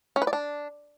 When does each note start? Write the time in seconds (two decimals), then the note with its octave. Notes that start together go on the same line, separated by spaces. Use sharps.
0.16 C#4
0.22 B4
0.27 D5
0.33 D4